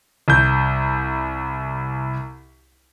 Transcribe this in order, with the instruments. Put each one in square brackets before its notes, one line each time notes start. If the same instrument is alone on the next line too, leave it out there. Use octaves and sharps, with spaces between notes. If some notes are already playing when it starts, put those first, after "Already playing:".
[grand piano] C2 G6